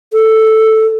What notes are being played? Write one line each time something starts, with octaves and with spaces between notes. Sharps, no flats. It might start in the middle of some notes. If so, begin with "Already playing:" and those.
A4